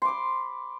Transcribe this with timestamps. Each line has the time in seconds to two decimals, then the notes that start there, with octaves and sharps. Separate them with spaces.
0.02 C6
0.05 D6
0.08 B5